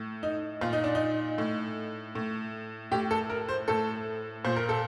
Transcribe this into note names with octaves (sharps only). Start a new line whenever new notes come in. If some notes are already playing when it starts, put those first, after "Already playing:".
Already playing: A2
D#4
A#2 F4
D#4
D4
D#4
A2
A2
A2 G4
A4
A#4
C5
A2 A4
A#2 C5
A#4
A4